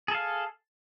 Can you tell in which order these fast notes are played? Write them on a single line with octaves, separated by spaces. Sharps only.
G#4 A4 F5